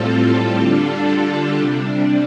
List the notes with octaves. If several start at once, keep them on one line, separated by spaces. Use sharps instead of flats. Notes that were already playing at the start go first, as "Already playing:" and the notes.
Already playing: A2 G3 C4 F4 A4
D3 G3 D4 F4 A4
C3 G3 D4